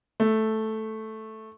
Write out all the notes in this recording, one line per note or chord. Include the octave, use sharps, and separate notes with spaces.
A3